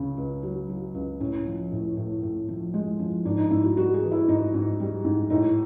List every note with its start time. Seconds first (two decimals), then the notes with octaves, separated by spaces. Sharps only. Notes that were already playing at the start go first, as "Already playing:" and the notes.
Already playing: C#2 C#3
0.17 C#2
0.43 F#3
0.69 F#3
0.94 C#2
1.20 A2 C#4
1.46 F3
1.72 A2
1.97 A2
2.23 A2
2.48 F3
2.74 G#3
2.99 F3
3.25 G#2 D4
3.38 D#4
3.50 G#2 E4
3.64 F#4
3.77 G3 F#4
3.94 G#4
4.02 E3
4.12 E4
4.28 G#2 D#4
4.54 G#2
4.80 G3
5.05 G#2
5.30 A2 D#4